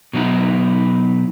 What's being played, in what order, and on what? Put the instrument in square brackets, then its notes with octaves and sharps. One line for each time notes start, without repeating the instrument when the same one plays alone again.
[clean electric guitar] B2 F#3 D#4 E4